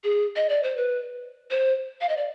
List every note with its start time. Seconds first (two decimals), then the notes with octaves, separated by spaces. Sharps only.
0.04 G#4
0.36 D#5
0.49 D5
0.63 C5
0.77 B4
1.51 C5
2.01 F5
2.09 D#5
2.17 D5